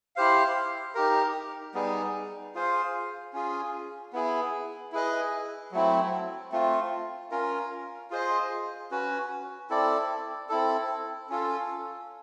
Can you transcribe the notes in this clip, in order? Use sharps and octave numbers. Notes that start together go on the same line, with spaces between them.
E4 G4 C5 F5
D#4 G4 A#4
G3 B3 D#4 G#4
F4 G#4 C5 F5
C#4 F4 G#4
B3 E4 G#4
E4 G#4 B4 D#5
F#3 A3 C4 E4
A3 C4 F4
C#4 F4 A#4
F4 G#4 C5 D#5
C#4 F#4 B4
C4 E4 A4 D5
C4 E4 A4
C#4 F4 A4